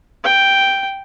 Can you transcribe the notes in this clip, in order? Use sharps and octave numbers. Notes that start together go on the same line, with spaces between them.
G5